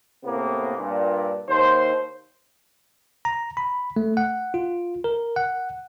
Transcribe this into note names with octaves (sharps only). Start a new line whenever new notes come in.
A2 C3 A#3 B3
G2 A#2
D#2 C5
A#5
B5
A3
F#5
F4
A#4
F#5